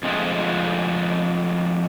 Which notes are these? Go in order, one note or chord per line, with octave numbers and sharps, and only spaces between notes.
F2 F3 G#3 A3